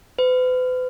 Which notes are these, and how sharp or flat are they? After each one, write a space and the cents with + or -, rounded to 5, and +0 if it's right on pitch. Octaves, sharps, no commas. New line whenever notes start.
B4 +40